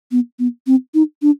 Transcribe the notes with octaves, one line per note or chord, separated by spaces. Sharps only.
B3
B3
C4
D#4
D4